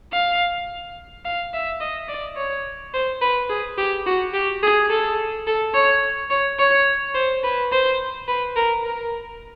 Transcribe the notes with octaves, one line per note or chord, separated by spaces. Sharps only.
F5
F5
E5
D#5
D5
C#5
C5
B4
G#4
G4
F#4
G4
G#4
A4
A4
C#5
C#5
C#5
C5
B4
C5
B4
A#4
A#4